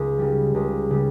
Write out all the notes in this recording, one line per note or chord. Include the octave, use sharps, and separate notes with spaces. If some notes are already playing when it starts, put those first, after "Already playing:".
Already playing: C#2
C#3 G3
C#2
C#3 G3